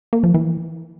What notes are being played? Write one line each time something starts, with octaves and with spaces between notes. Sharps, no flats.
A#3
F3
E3